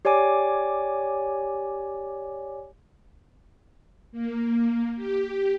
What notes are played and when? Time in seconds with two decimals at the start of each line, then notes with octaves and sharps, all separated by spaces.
0.05 G4 C#5 D5 G#5 D6
4.12 A#3
4.96 G4